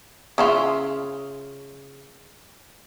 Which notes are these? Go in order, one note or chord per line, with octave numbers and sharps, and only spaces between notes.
C#3 E4 F4